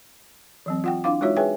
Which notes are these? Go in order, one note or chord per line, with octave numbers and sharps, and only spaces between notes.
E3 F#3 C4
F4 F#5 G5
D4 E4 F5 D6
G#3 D#4 F4 F#4 C#5 E5
G#4 B4 C#5 E5 G5 G#5